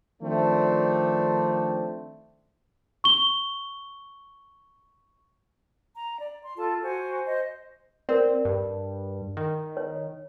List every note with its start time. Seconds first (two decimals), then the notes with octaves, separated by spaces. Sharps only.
0.22 D#3 F3 A3 C4 D4
3.04 C#6 G7
5.95 A#5
6.18 D5
6.43 C6
6.57 F4 A4 A5
6.81 F#4 C5 G#5
7.24 C5 D#5
8.09 C4 A#4 D5
8.45 G2
9.37 D#3
9.77 C#5